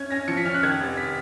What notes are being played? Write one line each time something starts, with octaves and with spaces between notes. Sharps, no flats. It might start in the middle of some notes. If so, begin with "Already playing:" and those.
Already playing: C#4 G#6
C#4 A#6
F3 C#7
B6
C#4 F6
F#6
D#3 G#6
F1
B6